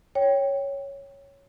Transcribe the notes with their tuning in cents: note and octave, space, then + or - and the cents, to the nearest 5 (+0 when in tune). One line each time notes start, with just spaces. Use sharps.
C#5 +0 G5 +0